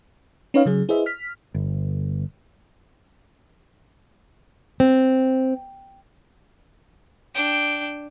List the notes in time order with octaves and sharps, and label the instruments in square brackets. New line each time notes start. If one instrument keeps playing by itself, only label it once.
[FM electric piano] C#4 D#4 B4 C#5 D#5 F5
C#3 F#3 G#4
E4 G#4 B4 C5 D#5 E5
F6 B6
[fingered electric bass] G1
[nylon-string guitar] C4
[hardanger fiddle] D4 G5